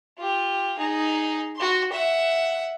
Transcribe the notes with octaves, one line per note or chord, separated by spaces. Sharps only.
F4 G4
D#4 G#4
F#4 C6
E5 F#5